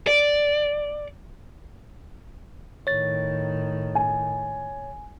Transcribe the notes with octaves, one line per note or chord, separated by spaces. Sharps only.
D5
A2 D#3 C#5 A6
G#5